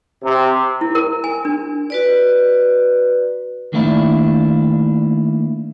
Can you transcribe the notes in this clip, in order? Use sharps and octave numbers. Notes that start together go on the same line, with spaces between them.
C3
E4
A#4
G#5
D4
F#4 B4 D5
D#3 A3 A#3 D4 E4